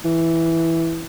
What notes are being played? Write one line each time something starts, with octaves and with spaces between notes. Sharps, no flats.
E3